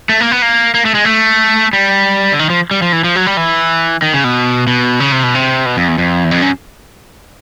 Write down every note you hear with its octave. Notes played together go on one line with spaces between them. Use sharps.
A3
A#3
B3
A#3
A#3
A3
G#3
A3
G3
D3
D#3
F3
G3
F3
E3
F3
F#3
G3
E3
D#3
C#3
B2
B2
C#3
C3
B2
C3
B2
F2
E2
F2
E2
F2
F#2